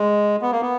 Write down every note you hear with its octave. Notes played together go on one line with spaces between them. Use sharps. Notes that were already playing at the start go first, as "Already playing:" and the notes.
Already playing: G#3
B3
A#3
B3